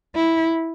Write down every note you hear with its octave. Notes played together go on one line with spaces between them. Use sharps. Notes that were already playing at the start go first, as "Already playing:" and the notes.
E4